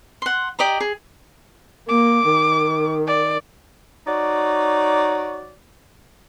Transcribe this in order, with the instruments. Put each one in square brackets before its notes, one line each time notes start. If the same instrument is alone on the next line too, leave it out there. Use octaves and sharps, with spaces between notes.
[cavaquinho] F#5 C6
G4 D5 D#5 A#5
G#4
[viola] A#3 [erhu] D6
[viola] D#3
[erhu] D5
[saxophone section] D#4 F#4 C#5 D5